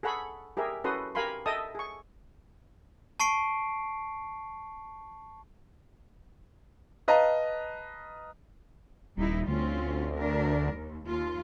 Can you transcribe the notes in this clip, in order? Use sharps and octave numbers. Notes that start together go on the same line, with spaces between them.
G#4 A4 F#5 B5 C#6
G4 G#4 A#4 E5
C#4 F#4 A4 B4 C6 D#6
G4 A#4 F5 G#5 B5 C6
A4 D#5 E5 G5 A5 D#6
G#4 C#6
A5 C#6 C7 D7
B4 D#5 F5 A5 A#5
D#1 G3 D#4 E4
D2 C4 C#4 F4
D4 A#4
D#2
D#2 F4